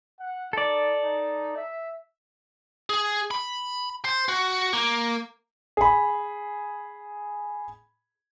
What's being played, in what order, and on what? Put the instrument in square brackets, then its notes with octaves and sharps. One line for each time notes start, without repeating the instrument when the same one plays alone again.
[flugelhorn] F#5
[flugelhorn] D#4 [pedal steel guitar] A4 D5
[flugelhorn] D#4
E5
[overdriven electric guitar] G#4
B5
C5
F#4
A#3
[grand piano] G#4 B5